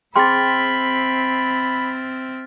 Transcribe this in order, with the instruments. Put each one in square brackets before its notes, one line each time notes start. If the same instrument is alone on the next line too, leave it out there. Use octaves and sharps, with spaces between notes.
[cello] C4 E5 [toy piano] G#4 G5 C6 [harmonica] B5 [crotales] F6 A6